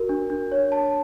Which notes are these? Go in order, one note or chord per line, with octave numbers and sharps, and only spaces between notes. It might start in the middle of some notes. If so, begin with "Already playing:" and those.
Already playing: F#4 A#4
D4
D4
C#5
A5